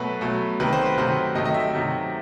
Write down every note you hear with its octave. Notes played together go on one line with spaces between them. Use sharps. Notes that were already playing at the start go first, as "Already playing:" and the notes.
Already playing: B2 F#3 A3 B4
B2 F#3 A3
C3 D#3 F#3 A3 B4
C5
B4
C3 D#3 F#3 A3 C5
C3 D#3 F#3 A3 D#5
D#5
E5
C3 D#3 F#3 A3